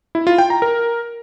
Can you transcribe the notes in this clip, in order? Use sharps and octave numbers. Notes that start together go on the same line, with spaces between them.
E4
F4
G5
A#5
A#4